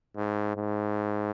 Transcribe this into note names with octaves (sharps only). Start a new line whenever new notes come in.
G#2
G#2